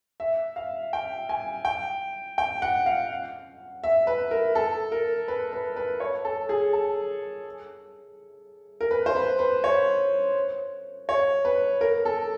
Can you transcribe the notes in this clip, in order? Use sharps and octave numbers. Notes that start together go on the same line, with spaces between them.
E5
F5
G5
G#5
G5
G5
F#5
F5
E5
B4
A#4
A4
A#4
B4
B4
B4
C#5
A4
G#4
A4
A#4
B4
C5
B4
B4
C#5
C#5
B4
A#4
A4